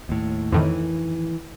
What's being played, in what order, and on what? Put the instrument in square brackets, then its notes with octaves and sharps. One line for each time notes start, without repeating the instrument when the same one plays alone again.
[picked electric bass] D#2 A2
[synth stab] F2 A2 D#3 [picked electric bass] E3